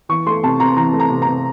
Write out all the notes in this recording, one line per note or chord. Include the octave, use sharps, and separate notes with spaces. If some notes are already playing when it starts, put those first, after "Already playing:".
E3 C#6
A3 C6
C3 A5
C3 A#5
E3 A#5
A3
A#5
C3
A#5
C3